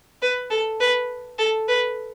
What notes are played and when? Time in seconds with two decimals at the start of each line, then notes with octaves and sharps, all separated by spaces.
0.22 B4
0.51 A4
0.80 B4
1.38 A4
1.68 B4